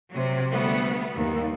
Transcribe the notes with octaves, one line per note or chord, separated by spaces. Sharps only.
C3 F#3
D2 G3 A3 B3
D#2